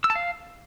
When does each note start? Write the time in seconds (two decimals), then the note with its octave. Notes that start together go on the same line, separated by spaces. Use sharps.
0.04 E6
0.10 A5
0.15 F5